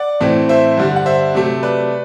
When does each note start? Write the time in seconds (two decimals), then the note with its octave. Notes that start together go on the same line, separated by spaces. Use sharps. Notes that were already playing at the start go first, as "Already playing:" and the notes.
Already playing: D5 F#5
0.20 A2 E3 A3 C4
0.49 C5 E5
0.78 G2 D3 G3
0.96 F#5
1.06 C5 E5
1.35 C3 F#3 A3
1.63 B4 D5